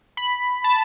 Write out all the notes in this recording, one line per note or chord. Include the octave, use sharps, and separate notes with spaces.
B5
A5